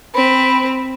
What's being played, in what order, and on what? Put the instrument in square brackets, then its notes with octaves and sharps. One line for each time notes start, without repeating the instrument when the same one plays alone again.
[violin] C4 [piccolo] B5